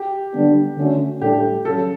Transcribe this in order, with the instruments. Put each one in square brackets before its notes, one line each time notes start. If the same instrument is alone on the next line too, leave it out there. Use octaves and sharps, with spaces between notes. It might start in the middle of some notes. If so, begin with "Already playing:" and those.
Already playing: [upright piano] G4
[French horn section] D3 G3 B3 D4
D3 A3 C#4 F#4
[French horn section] A2 G3 D4 A4 [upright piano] G4
[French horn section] C#3 F#3 [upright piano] A4